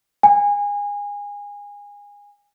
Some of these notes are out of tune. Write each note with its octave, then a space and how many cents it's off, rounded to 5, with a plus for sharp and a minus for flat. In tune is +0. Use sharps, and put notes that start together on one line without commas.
G#5 -25